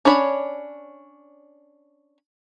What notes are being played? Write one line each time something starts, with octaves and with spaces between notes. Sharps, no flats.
C#4 D4 C#5 B5